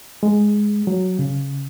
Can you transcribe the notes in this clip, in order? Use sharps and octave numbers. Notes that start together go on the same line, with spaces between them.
G#3
F#3
C#3